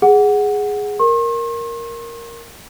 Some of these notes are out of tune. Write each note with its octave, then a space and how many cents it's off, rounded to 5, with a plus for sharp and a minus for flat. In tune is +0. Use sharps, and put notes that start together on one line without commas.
G#4 +0 F#5 +0
A#4 +0 C6 +45